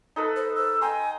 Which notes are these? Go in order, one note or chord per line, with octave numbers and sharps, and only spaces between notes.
D#4 A4 B4
C5
E6
G5 G#5 A#5 C6